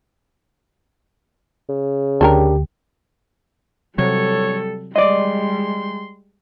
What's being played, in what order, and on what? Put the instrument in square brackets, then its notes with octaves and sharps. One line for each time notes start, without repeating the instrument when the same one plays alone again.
[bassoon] C#3
[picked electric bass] D2 [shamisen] D4 A4 A#4 [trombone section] G4
[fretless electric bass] C3 F#3 [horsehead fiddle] G3 A4 [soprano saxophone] C#5
[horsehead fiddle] G3 G#3 [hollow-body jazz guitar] D5 D#5 [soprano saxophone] C6